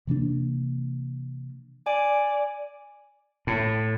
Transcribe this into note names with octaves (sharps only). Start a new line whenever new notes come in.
C3 E3 A#3 D4
D5 G#5
A2